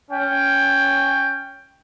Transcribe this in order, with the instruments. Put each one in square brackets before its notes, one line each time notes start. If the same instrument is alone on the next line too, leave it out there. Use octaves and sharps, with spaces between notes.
[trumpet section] C#4 G5